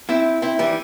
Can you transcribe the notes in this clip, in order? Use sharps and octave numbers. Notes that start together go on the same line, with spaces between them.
C4 E4
C4 E4
E3 G3